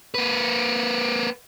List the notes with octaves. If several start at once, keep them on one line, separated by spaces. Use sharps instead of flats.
A#3 B4